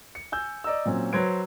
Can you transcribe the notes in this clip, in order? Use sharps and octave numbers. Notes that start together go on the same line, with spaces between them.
C#7
G#5 E6 G6
D5 D#5 A#5 E6
A#2 F#3 C4 C#4
F#3 B4 C5 G#6 D7